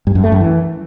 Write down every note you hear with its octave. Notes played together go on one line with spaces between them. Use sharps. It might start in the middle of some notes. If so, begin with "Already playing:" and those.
G2
F#2
A3
F#2
E3